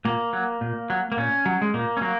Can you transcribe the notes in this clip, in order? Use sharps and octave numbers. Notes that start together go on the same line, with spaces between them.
A#2 A#3
F#3
A#2
F#3
A#3
A#2 C#4
F#3
G#3
A#2 A#3
C#4
F#3 A#3